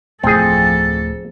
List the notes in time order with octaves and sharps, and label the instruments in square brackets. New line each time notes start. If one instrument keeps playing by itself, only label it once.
[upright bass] D1 [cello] F2 A4 [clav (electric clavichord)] C4 G#4